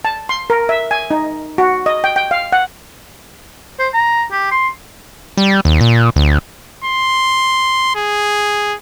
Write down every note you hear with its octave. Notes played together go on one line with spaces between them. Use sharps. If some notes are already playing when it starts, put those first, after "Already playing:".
A5
C6
A#4
E5
G#5
D#4
F#4
D#5
G5
G5
F5
F#5
C5
A#5
G4
C6
G3
D#2
A#2
D2
C6
G#4